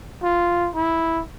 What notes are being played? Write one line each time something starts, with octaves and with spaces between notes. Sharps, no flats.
F4
E4